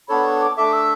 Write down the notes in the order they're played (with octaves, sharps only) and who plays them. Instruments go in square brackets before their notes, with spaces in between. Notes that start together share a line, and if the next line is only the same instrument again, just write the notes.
[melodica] B3 D4 A4 C#5 [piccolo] B5
[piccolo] C#6
D6
[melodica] A3 D4 A4 E5 [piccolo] D6
[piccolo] E6